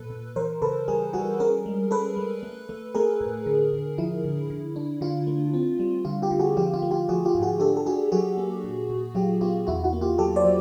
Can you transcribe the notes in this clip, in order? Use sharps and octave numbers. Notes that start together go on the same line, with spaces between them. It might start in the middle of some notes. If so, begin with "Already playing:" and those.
Already playing: A#2 A4 B4
A#2
E3 A#4 C5
C#3 A4 B4
G3 G#4 A#4
G3 F#4 G#4
C#4 G#4 A#4
G#3
C#4 A4 B4
G#3
A3
A3
A3 G#4 A#4
A2
D3
D3
F3 E4
D3
D3
D4
D3 F4
A3
C4
G3
D3 F4
F4 G4
D3
F#4 G#4
F3 F4 G4
F4
A3
F4 G4
F3 F#4 G#4
F4 G4
G#2
F#4 G#4
D4 G4 A4
A4
D4 F#4 G#4
F#3 F#4 G#4
A#3
A#2
A#2
F#3 F4 G4
B3 F4 G4
E2 E4 F#4
E4 F#4
A#3
F4 G4
F#3 G4 A4
C5 D5
F#3